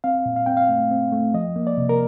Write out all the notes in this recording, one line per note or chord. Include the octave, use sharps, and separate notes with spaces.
C4 F5
A#2
F5
C4 G5
F5
A3
C4
A3
F3 D#5
A#3
D5
C3
A#4